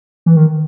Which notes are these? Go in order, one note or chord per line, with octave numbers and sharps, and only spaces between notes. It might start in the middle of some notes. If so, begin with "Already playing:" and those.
E3
D#3